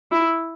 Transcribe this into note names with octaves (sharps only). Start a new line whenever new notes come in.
E4